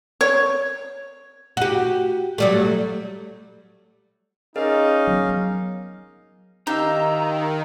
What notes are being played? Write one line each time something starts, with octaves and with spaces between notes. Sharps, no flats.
C#5
F#4 G4
F#3 G3 A3
C#4 D#4 G#4 A#4 D#5 F5
F#3 B3
D#3 D#4 G4 F5 A#5 E6